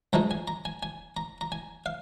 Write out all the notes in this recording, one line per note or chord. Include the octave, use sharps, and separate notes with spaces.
G2 F3 G#3 D#4 A#5
G#5
A#5
G#5
G#5
A#5
A#5
G#5
F5